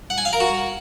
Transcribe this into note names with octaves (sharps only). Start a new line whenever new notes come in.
F#5
G#5
F5
A#4
F#4